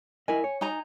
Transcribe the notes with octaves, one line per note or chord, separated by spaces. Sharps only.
E4 A#4 D#5 G#5
C#5
D#4 G#5 A#5